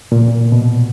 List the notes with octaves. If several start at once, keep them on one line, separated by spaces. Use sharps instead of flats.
A#2
B2